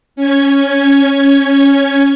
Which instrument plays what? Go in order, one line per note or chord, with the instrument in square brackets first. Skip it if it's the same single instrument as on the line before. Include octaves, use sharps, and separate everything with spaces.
[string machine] C#4 G#6